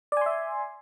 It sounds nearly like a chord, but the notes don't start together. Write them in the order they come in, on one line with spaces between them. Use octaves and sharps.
D5 G#5 C6 E5